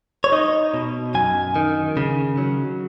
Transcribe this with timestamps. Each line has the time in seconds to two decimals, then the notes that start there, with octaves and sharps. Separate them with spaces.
0.24 C#5
0.32 D#4 D#5
0.74 B2
1.14 F#2 G#5
1.56 D#3
1.97 C#3
2.37 F#3